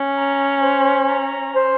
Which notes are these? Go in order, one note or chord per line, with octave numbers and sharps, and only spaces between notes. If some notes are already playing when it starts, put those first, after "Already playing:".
Already playing: C#4
A#5
C5
A#5
C5